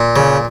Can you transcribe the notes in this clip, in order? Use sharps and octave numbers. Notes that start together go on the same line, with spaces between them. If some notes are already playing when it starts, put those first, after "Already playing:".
Already playing: A#2
C#3